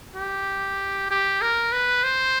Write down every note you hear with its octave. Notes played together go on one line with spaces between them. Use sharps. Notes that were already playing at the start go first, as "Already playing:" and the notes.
G4
G4
A#4
B4
C5